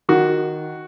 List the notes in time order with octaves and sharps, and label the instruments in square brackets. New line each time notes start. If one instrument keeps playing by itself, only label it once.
[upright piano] D#3 F#4